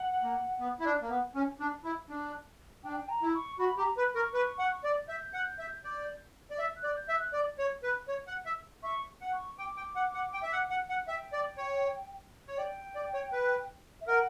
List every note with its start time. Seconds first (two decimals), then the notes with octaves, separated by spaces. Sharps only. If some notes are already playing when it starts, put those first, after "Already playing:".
Already playing: F#5
0.23 A#3
0.60 B3
0.80 E4
0.85 D4
1.02 A#3
1.10 B3
1.35 C#4
1.60 D4
1.84 E4
2.10 D4
2.84 D4 G5
2.97 G5
3.09 A#5
3.22 E4
3.35 C#6
3.59 F#4 B5
3.78 G4 A#5
3.97 B4 B5
4.15 A#4 C#6
4.34 B4
4.59 F#5
4.84 D5
5.08 E5 G6
5.34 F#5
5.59 E5
5.84 D5
6.51 D5
6.59 E5
6.77 F#6
6.84 D5
6.96 G6
7.09 E5
7.15 F#6
7.33 D5
7.59 C#5
7.83 B4
8.08 C#5
8.27 F#5
8.46 E5
8.83 E5 C#6
9.21 F#5
9.33 C#6
9.58 G5 D6
9.77 G5
9.96 F#5
10.14 F#5
10.33 G5
10.43 E5
10.52 F#5
10.70 F#5
10.89 F#5
11.08 E5 G5
11.33 D5
11.58 C#5
12.48 C#5
12.57 D5 G5
12.95 D5
13.14 C#5
13.33 B4
14.01 E5
14.07 A#4 F#5